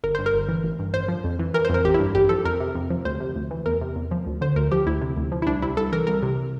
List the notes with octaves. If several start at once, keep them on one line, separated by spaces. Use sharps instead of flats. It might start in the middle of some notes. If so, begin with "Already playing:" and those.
G1 A#4
G2 C5
A#4
G1
E3
A1
G2
A1 C5
F3
F2
E3
E3 A#4
C5
F2 A#4
A1 G4
E4
G2
A1 G4
F3 A4
F2 A#4
C3
F2
F3
D2 C5
C3
D2
E3
E2 A#4
C3
E2
F3
D2
D3 C5
D2 A#4
F3 G4
D2 E4
C3
D2
F3
E4
C2 D4
C3 E4
C2 A4
E3 A#4
C2 A#4
C3